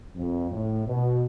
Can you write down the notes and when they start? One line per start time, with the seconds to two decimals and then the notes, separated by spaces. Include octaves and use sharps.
0.16 F2
0.51 A2
0.86 B2